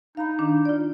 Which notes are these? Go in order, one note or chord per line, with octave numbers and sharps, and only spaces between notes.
D#4 F5 B5
D#3 D4
F4 D5